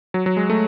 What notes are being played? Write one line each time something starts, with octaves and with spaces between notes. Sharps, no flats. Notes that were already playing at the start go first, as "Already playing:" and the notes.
F#3
F#3
G#3
A3